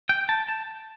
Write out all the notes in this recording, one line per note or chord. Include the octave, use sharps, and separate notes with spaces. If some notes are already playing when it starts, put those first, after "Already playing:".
G5
A5
A5